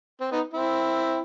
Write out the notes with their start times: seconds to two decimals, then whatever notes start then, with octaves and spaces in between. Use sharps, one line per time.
0.20 C4
0.31 B3 D#4
0.53 C4 E4